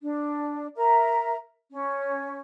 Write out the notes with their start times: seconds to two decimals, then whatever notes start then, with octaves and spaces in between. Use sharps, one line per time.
0.02 D4
0.76 A#4 E5 A#5
1.71 C#4